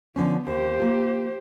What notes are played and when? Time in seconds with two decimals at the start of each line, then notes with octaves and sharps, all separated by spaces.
0.16 D3 F3 B3 C#4
0.47 D#2 G4 C5
0.80 A#3 F4